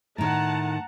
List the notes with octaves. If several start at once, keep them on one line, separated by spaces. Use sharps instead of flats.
A2 D#3 F#5 A5 A#5